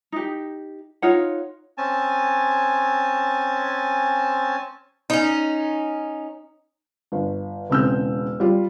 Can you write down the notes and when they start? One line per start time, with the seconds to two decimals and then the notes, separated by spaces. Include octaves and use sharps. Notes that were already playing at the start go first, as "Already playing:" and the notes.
0.12 D#4 G4
1.02 D#4 F4 C#5 F#5
1.78 C4 C#4 G#5 A5
5.10 C#4 D#4
7.12 G1
7.70 E1 C#3 C4 E6 F6 G6
8.40 G3 F4